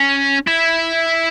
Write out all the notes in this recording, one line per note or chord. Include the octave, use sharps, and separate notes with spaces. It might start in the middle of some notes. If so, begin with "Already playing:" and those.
Already playing: C#4
E4